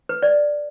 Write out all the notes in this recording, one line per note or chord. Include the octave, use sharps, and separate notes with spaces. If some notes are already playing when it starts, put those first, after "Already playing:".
B4
D5